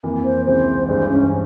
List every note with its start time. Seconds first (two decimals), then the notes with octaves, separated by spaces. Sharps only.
0.03 F2 E3 A#3
0.24 C5
0.46 C#2 C3 E3 G#3 C5
0.88 G2 E3 G#3 C5
1.09 C#4